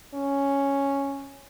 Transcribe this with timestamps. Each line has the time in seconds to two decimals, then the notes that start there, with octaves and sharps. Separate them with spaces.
0.14 C#4